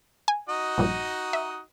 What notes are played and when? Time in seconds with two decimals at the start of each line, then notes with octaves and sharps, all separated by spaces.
0.28 G#5
0.49 D#4 F#4 D#5
0.78 A#1 G2
1.33 E5